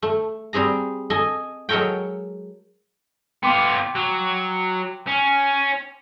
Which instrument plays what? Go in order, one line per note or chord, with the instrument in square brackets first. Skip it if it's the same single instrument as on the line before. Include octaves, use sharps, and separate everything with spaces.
[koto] A3
G3 C4 G#4 A#5
A4 D#5 G#5
F#3 G#3 A4 A#4 C#5 G5
[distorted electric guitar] B3 F4 [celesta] G5 C6 D6
[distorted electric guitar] F#3
C#4